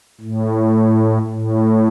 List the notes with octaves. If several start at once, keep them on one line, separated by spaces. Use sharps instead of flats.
A2
A2